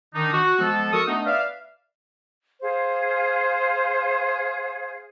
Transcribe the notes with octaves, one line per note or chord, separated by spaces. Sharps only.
D#3 D4 D#4
F#4
F3 G#3 B3 A4
F#4 A4 A#4 C#6 D#6 E6
A3 B3 D4 D#4
B4 D5 E5 F5
G#4 C5 F5